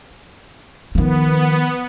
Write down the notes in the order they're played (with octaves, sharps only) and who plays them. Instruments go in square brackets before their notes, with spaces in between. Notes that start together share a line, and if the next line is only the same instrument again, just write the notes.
[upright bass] D#3 F3 [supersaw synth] B3